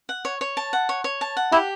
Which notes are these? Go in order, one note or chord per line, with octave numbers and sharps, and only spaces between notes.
F#5
C#5
C#5
A5
F#5
C#5
C#5
A5
F#5
E4 G4